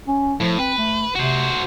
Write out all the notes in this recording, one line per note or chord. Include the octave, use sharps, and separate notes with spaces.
C#4
A2 F3
C4 B4
A3
C3 F#4 C5